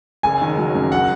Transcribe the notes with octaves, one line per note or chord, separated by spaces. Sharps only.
F#1 G#5
D#3
F#3
F#2
F#5